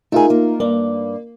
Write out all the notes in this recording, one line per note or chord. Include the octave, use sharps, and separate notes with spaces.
A3 D#4 F4 G#4 A#4
A#3
G2 A#3 D5